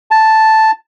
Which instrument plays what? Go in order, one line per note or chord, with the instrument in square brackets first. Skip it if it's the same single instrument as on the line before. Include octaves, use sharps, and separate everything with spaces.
[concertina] A5